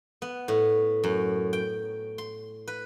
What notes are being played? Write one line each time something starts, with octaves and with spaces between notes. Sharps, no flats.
B3
A2
F#2
G5
C6
B4